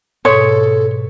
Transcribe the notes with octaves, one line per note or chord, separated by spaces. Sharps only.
G#2 B2 A4 C#5 C6